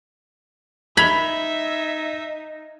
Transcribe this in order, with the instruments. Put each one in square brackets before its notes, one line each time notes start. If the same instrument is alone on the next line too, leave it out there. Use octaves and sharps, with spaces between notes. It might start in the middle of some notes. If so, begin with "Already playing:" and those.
[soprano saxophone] D#4 [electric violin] E5 [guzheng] B5 [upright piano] G#6 F7 G7